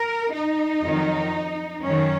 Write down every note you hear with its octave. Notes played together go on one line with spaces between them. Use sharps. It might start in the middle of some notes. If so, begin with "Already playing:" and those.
Already playing: A#4
D#4
F2 D#3 F#3
F#2 D#3 F#3 C#4